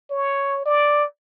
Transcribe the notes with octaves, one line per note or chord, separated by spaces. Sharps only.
C#5
D5